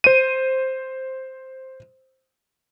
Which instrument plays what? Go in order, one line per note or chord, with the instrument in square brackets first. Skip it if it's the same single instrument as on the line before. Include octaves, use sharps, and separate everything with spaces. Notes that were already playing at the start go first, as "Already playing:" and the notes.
[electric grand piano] C5 D#7